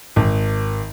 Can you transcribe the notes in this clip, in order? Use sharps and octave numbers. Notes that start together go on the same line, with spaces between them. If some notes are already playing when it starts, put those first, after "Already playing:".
G#1